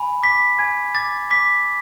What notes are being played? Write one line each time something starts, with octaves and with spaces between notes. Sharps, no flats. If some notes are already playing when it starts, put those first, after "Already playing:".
Already playing: G#5 B5
D6 B6
G#5 G#6
D6 A6
D6 B6